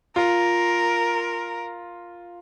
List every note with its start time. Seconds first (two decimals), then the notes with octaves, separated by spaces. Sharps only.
0.16 F4 A#4